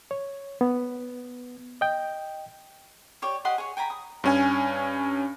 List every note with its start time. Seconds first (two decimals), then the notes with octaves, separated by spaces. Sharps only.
0.11 C#5
0.61 B3
1.81 D#5 G5
3.22 G4 C#5 D5
3.45 G4 D#5 F#5 C6
3.58 G#4 C#5
3.77 G5 G#5 A#5 B5
3.90 D#6
4.24 G2 C#4 G#5